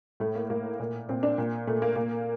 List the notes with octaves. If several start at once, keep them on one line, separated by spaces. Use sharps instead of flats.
A2 A3
A#3
A2 A#3
A#2
A#2 C4
D4
A#2
A#2 A3
A#3
A#2 A#3